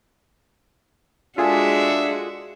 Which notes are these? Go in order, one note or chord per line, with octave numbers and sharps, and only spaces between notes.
G#3 D4 F4 F#4 G#4 A4 E5